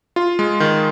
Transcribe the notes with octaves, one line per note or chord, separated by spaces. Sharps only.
F4
G#3
D#3